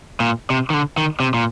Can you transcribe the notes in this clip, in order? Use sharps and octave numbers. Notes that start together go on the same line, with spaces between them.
A#2
C3
D#3
D3
D#3
C3
A#2